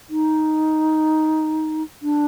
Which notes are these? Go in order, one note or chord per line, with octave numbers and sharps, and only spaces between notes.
D#4
D4